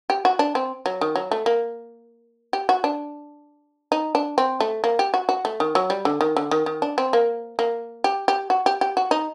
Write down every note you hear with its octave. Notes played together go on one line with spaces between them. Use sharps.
G4
F#4
D4
C4
F#3
D#3
F#3
A3
A#3
G4
F#4
D4
D#4
D4
C4
A3
A#3
G4
F#4
F#4
A3
D#3
F#3
G3
D3
D#3
D3
D#3
D#3
D4
C4
A#3
A#3
G4
G4
F#4
G4
G4
F#4
D#4